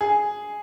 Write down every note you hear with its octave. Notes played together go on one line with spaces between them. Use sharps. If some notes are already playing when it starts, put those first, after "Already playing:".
G#4